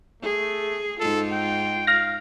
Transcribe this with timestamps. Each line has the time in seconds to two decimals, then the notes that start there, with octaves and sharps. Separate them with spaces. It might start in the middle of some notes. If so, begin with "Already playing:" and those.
0.23 A3 G#4
1.00 G#2 D#4 F4 A4
1.31 G5
1.87 F5 F6 A#6